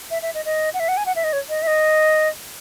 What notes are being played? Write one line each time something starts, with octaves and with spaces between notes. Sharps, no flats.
E5
E5
D#5
D#5
F#5
E5
F#5
G#5
F#5
E5
D#5
C#5
D#5
E5
D#5